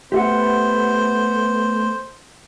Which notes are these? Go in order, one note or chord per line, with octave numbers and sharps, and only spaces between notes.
A3 B3 G4 C5 E5 F#5